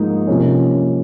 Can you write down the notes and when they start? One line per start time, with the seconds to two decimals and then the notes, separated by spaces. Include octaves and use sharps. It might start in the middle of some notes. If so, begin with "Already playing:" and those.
Already playing: G#2 F3 A#3 D#4
0.27 C3 F3 A#3 C#4